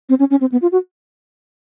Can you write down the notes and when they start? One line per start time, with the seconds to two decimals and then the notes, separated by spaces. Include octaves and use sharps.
0.09 C4
0.19 C#4
0.31 C#4
0.41 C4
0.52 B3
0.62 F4
0.72 F#4